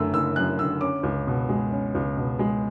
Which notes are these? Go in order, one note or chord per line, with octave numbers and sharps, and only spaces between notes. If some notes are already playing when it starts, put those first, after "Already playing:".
Already playing: F#1 F#2 D3 A3 E6
F#1 E6
F#2 F#6
D3 E6
C#4 D6
C#2
B2
G#3
C#4
C#2
B2
G#3